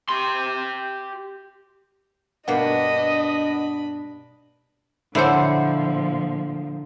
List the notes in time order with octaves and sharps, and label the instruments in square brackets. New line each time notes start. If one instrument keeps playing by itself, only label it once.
[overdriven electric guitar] G4 C6
[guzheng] G2 B2 A#3 [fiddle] D4 B5 [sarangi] D#5 [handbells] F#5
[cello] A#2 F3 [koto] D3 [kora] E4 C5 [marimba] C#5 F#5